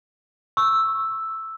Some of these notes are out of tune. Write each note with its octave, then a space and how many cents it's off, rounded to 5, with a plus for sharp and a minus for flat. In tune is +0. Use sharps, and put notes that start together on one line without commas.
C#6 -10 E6 +0